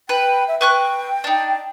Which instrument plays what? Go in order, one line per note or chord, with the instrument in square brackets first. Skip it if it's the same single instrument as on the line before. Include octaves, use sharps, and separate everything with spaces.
[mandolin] B4 [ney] G5
[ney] E5
[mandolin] B4 C#6 F#6 [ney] G5
[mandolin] D4 D#4